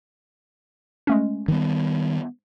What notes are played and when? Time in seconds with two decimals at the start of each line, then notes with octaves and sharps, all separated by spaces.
1.07 G#3 A3 C#4
1.48 D#3 G3 B3